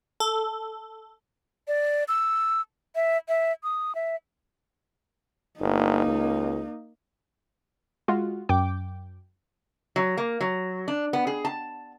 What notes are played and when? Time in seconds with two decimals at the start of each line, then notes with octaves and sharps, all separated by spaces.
0.20 A4
1.67 D5
2.08 E6
2.95 E5
3.28 E5
3.63 D#6
3.95 E5
5.60 G1 A#3 D#4
6.06 C#2
8.08 G#3 F4 F#4
8.49 F#2 G5 D6
9.96 F#3
10.17 A#3
10.41 F#3
10.88 D4
11.13 B3
11.27 G#4
11.45 A5